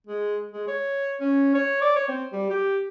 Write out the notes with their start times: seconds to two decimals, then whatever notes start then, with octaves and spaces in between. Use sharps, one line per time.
0.07 G#3
0.51 G#3
0.68 C#5
1.20 C#4
1.55 C#5
1.81 D5
1.96 C#5
2.08 C4
2.32 G3
2.50 G4